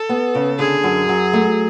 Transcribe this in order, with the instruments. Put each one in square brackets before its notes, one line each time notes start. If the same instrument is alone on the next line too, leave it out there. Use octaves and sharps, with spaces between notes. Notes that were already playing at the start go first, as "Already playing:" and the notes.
Already playing: [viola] A4
[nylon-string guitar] B3
C#3
[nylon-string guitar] D3 [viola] G#4
[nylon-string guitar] F#2
F#3
A3